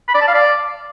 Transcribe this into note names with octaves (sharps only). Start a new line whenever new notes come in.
B5
D5
A5
F5
D5